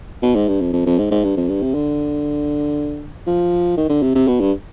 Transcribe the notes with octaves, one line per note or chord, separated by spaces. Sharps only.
B2
G#2
G2
F2
F2
F2
G#2
G#2
G2
F2
G2
C3
D3
F3
D#3
D3
C3
C3
B2
G2